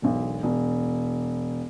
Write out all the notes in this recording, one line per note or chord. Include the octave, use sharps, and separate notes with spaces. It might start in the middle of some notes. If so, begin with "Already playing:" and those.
E1 B1
E1